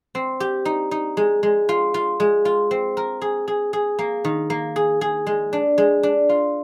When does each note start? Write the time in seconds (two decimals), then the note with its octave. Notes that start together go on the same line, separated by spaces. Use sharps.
0.15 C4
0.40 G4
0.65 D#4
0.91 D#4
1.17 G#3
1.43 G#3
1.69 F4
1.94 F4
2.20 G#3
2.45 F4
2.71 C4
2.97 A#4
3.21 G#4
3.48 G#4
3.73 G#4
3.99 A#3
4.25 D#3
4.50 A#3
4.76 G#4
5.01 G#4
5.27 G#3
5.53 D4
5.78 G#3
6.03 D4
6.29 F4